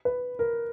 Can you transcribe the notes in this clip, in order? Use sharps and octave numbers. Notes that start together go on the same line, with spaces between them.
B4
A#4